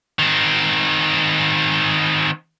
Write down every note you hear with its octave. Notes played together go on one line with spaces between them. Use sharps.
D#3 C4